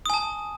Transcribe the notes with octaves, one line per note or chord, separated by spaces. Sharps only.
G#5 A5 D#6